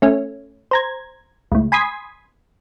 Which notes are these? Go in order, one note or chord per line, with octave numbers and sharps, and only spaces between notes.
A3 C#4
C5 A#5 G#6
C#2 A2
G#5 B5 C6 D#6 G#6 B6